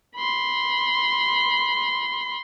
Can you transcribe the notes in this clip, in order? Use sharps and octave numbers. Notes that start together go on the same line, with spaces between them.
B5 C6